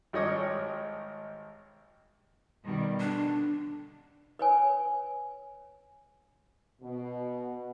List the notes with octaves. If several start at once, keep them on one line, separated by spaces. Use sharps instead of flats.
G#1 G3 C#5 D#5 C#6
B2 D#3 G3
D3 D4
B4 C#5 G#5
B2